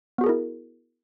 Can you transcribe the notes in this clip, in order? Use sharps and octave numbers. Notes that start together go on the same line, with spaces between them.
B3 E4 F#4 G#4 A#4